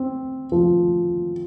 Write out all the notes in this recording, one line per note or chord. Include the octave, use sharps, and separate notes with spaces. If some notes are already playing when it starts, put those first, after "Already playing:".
Already playing: C4
F3